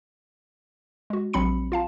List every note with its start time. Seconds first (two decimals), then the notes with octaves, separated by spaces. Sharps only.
1.10 G#3 F#4
1.33 A#1 F#3 C4 B5 C#7
1.72 F4 F5 A5